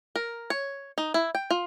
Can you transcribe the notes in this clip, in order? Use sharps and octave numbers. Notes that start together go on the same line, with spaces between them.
A#4
C#5
D#4
E4
G5
F4